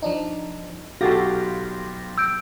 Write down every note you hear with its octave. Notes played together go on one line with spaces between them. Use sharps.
F3 D4 D#4
B1 F#4 G4 A4 F5 C6 A6 A#6
E6 G6 D7